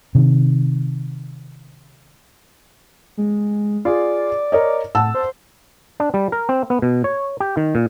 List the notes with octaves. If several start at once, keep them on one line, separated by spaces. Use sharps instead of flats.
C3 D#3
G#3
F4 G#4 D5
A#4 C#5 D#5
A2 F#5 A5 E6
C5
D4
G3
A#4
C4
B3
B2
C#5
G4
D#3
A#2